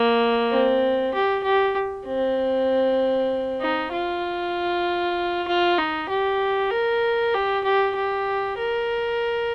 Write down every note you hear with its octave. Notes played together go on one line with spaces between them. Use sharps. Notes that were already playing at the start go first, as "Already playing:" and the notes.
Already playing: A#3
C4
G4
G4
C4
D#4
F4
F4
D#4
G4
A#4
G4
G4
G4
A#4